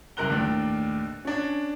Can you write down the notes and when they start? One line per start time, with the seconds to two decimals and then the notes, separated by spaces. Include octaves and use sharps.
0.17 F#1 C2 A#4 A#5 F#6 G7
0.30 D#2 A2 D4
1.25 C#4 D4